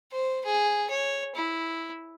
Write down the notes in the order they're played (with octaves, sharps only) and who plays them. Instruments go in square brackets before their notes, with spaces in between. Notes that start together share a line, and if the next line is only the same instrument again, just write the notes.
[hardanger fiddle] C5
G#4
C#5
E4